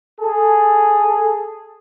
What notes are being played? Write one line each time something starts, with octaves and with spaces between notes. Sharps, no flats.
G#4 A4